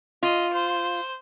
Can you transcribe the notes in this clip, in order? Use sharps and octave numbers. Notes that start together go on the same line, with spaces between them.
F4 D#5
C5